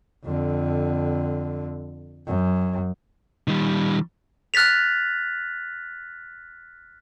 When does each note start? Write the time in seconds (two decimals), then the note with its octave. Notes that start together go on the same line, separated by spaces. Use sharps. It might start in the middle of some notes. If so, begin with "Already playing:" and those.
0.25 F2 D3
2.27 F#2
3.48 D#3 G3
4.54 F6 F#6 A6 B6 F7